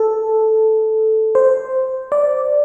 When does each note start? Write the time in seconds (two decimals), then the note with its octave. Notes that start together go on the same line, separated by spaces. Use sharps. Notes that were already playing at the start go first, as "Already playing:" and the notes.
Already playing: A4
1.35 C5
2.12 D5